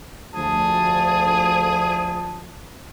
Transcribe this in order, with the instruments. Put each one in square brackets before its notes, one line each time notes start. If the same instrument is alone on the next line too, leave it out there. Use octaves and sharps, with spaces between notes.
[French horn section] D2 F3 [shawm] G#4 [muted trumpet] A5